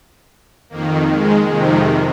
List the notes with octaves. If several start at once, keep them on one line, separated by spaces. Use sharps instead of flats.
F2 D#3 A#3
G#3
F2 C3 D#3